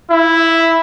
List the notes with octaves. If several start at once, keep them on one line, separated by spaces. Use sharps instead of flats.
E4